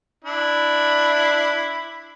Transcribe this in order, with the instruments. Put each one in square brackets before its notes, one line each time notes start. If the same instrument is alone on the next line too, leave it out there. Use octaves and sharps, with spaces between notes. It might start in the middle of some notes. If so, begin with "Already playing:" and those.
[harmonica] D4 E4